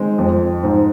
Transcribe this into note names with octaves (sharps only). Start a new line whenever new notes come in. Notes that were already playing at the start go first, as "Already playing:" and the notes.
Already playing: D#3 G#3 C4
F2
G#2